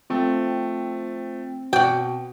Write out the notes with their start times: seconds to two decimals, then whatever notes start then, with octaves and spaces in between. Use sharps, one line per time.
0.10 F3 A3 C4
1.73 B2 F#4 D5 G5